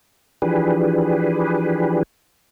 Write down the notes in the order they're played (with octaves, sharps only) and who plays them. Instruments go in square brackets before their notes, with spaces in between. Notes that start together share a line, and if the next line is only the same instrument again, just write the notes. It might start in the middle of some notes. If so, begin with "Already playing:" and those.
[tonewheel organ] E3 F3 D4 G4 G#4 B4